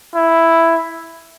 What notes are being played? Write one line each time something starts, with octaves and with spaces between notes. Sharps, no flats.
E4